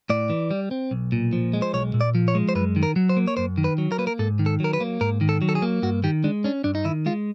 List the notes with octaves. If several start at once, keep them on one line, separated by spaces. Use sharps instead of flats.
A2 D5
E3
G3
C4
B1
A#2
F3
G#3
C5
B1 C#5
A#2
D5
F3
C#5
G#3
C5
F#2 B4
D#3
A#4
F#3
C5
A#3
C#5
F#2 C5
D#3
B4
F#3
A#4
A#3 B4
A#4
G#2 A4
D#3
A4
F#3 A#4
B4
A#3
G#2 A#4
D#3
A4
F#3
A4
G#4
A#3
G2 F#4
D#3 G4
G#3 D4
C#4 D4
G2 D4
D#4
D#3 E4
G#3 F4